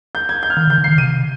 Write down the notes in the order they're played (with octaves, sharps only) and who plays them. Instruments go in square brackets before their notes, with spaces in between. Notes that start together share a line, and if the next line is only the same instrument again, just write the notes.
[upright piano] G6
G#6
G6
F6
[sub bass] D#3 [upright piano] G6
[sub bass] D3
[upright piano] G6
[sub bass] D3
[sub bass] D#3 [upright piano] C7
[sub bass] C3 [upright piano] D#7